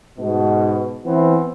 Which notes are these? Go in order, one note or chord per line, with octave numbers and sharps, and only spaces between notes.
G#2 B2
E3 B3 C4